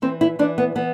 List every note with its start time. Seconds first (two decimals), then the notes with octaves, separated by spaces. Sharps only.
0.02 E3 C4
0.21 E4
0.39 E3 D4
0.58 B3
0.75 E3 B3